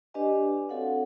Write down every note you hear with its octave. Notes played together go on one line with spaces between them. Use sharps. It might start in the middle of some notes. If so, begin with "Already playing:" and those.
D4 G4 B4 D5 D#5 G#5
C4 F#4 A4 C#5 F5 F#5